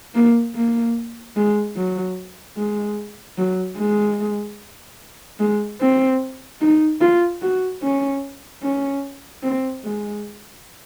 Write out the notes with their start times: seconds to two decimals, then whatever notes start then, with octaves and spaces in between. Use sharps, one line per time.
0.15 A#3
0.55 A#3
1.36 G#3
1.76 F#3
2.57 G#3
3.38 F#3
3.78 G#3
5.39 G#3
5.80 C4
6.61 D#4
7.01 F4
7.41 F#4
7.82 C#4
8.62 C#4
9.43 C4
9.84 G#3